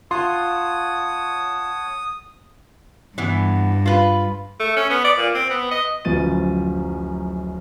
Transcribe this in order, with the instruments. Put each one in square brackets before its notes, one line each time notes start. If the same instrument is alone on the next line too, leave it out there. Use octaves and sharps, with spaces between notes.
[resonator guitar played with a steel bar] F4 [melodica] C#5 F#5 A5 [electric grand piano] C6 [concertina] D#6
[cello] G2 [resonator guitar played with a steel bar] E3 B3
[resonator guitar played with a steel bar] F4 B4
[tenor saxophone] A3
C#4
B3
D5
A#2
C4
B3
D#5
[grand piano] D1 F#2 F3 B4 A6 D#7